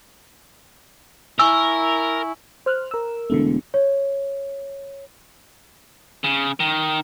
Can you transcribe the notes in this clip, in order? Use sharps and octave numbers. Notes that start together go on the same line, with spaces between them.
E4 A#4 G#5 C#6 E6
C5 F6 F#6
A#4 E6
E1 D3 A3
C#5
C#3
D#3